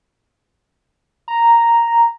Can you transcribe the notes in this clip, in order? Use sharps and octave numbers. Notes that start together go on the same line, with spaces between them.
A#5